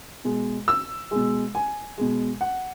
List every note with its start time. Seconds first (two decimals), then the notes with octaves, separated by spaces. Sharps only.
0.24 B2 G#3
0.68 E6
1.11 B2 G#3
1.55 G#5
1.98 B2 G#3
2.41 F#5